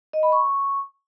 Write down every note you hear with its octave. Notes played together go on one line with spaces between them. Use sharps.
D#5
B5
C#6